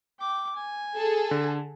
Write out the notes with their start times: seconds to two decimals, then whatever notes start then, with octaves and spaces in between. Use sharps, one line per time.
0.20 G5 D6
0.55 G#5
0.96 G#4 A4
1.31 D3